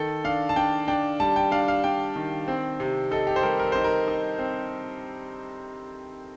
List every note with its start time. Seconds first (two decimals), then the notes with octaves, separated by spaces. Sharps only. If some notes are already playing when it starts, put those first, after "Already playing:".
Already playing: D#3 A4
0.24 D4 F5
0.49 A5
0.56 D4 G5
0.88 D4 G5
1.20 G3 A5
1.36 G5
1.51 D4 F5
1.68 F5
1.84 D4 G5
2.16 D#3
2.48 C4
2.80 C3
3.11 D#4 A4
3.27 G4
3.36 C5
3.43 G3 A#4
3.60 A#4
3.72 D#4 C5
3.84 A#4
4.08 D#4
4.39 C4